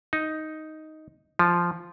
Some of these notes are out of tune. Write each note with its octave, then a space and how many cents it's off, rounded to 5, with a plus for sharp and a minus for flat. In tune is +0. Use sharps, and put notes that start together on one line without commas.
D#4 +5
F3 -5